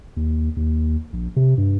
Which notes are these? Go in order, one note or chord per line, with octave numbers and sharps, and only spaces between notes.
D#2
D#2
A#1
C3
G2